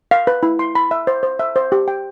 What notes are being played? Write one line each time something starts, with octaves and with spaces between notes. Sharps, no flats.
F5
B4
E4
C6
B5
E5
C5
C5
E5
C5
G4
G5